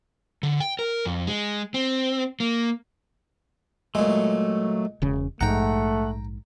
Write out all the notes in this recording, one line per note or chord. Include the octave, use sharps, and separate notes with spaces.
D3
G5
A#4
F2
G#3
C4
A#3
A#2 F#3 G#3 A3
E1 C#3
A#1 G#2 A3 F#5 G5 A#5